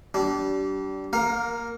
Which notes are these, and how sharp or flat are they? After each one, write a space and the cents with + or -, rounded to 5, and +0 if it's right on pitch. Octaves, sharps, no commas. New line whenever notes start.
G3 -35 D4 -25
A#3 +0 A#4 +0 F5 +35